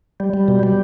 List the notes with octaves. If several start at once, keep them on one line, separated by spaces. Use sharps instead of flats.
G3
G3
B2
G3